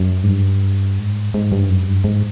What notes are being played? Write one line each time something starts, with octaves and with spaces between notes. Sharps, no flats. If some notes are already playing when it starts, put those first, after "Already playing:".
Already playing: F#2
G#2
G2
G#2
G#2
G2
F#2
G2
G#2